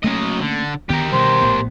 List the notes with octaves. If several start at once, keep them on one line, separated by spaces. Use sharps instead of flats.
F#3 A3 A#3 C#4 D#5
D3
D2 D#3 B3 G4 A#4
B2 D#3 G3 C5
A#1 A2 B3